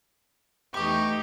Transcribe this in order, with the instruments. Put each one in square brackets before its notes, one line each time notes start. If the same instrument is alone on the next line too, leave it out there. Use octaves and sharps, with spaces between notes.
[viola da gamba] E2 A3 D#4 [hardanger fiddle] G4 [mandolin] C#6 D6